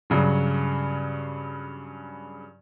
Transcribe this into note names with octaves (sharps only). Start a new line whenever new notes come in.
G2 C#3 F#3